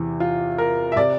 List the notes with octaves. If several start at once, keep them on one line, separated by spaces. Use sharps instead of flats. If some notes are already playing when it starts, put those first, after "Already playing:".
Already playing: E2 C3 E3
F4
A#4
E5
C3 D5